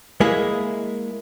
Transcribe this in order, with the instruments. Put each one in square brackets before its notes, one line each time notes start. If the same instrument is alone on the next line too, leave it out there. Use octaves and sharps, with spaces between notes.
[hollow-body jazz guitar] G#3 A#3 E4 G#4